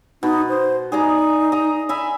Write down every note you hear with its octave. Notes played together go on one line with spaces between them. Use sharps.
B2 D#4
C5
D#4 G#4 D5 A#5
D#5 A#5
E5 G#5 B5